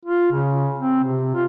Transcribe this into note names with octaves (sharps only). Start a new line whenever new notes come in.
F4
C#3
C4
C3
F4